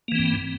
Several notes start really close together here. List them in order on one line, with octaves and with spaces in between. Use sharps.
A#3 E3 C4 G2